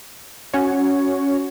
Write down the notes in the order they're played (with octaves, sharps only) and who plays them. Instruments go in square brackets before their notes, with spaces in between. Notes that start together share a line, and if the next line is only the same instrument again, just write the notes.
[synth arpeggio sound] C#4 F#4 C#5